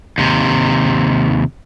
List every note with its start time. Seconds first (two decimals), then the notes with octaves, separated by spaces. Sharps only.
0.18 D#2 C3